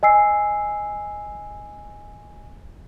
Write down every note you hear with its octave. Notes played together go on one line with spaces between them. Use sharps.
D#5 G#5 E6 C7